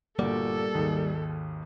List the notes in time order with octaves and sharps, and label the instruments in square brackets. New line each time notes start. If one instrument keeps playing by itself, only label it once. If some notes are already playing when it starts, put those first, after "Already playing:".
[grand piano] G1 A#2 F#4 [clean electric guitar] G3 A#3 D5 [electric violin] A4
[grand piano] G#1 D#2 G#4